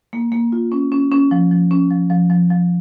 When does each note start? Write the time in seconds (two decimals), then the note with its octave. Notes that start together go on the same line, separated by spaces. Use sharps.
0.13 A#3
0.32 A#3
0.52 F4
0.72 C#4
0.92 C#4
1.12 C#4
1.31 F3
1.51 F3
1.71 C#4
1.91 F3
2.10 F3
2.30 F3
2.50 F3